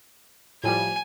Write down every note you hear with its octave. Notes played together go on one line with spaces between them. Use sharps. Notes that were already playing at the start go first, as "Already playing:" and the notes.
A2 F3 G3 G#5